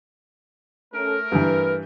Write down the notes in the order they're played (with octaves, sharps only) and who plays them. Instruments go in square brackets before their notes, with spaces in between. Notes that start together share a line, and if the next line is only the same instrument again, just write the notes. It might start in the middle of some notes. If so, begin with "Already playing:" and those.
[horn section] A3 A#4 [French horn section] C#4 A4
[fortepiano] G2 E3 [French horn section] B4